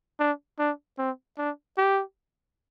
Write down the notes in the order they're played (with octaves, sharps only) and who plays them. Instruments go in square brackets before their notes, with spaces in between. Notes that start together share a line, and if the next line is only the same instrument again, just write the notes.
[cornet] D4
D4
C4
D4
G4